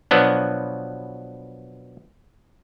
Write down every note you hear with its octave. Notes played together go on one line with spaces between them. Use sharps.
B2 F3 F#3 B3 D4